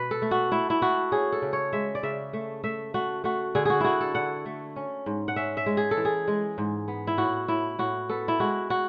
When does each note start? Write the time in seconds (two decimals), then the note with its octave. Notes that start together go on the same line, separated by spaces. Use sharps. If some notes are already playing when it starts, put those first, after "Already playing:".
Already playing: B2 B4
0.11 A4
0.22 A3
0.31 F#4
0.52 A3 E4
0.70 E4
0.82 A3 F#4
1.12 C#4 G#4
1.32 A4
1.42 C#3
1.53 C#5
1.73 G#3 E5
1.95 D5
2.03 C#3 E5
2.33 A3
2.64 A3 E5
2.94 A3 F#4
3.24 A3 F#4
3.55 D3 G#4
3.65 F#4 G#4
3.80 D3 E4 F#4
4.01 A4
4.15 D3 F#5
4.45 A3
4.76 C#4
5.06 G#2
5.28 F#5
5.36 C#4 E5
5.57 E5
5.66 G#3
5.77 G#4
5.91 A4
5.97 E3
6.05 G#4
6.28 G#3
6.58 G#2
6.88 B3
7.07 E4
7.18 A2 F#4
7.48 A2 E4
7.78 A2 F#4
8.09 B3 A4
8.28 E4
8.40 G#3 F#4
8.70 F#4